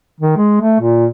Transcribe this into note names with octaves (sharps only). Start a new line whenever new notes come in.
D#3
G#3
A3
A#2